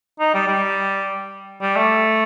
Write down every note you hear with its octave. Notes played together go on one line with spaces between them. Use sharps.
D#4
G3
G3
G3
A3